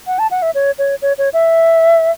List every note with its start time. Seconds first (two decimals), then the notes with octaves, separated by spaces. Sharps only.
0.07 F#5
0.19 A5
0.31 F#5
0.42 E5
0.55 C#5
0.78 C#5
1.02 C#5
1.18 C#5
1.33 E5